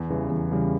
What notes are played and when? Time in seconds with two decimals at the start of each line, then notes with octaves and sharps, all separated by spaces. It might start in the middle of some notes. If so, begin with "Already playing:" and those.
Already playing: E2
0.10 C#3 E3 G3
0.30 E2
0.52 C#3 E3 G3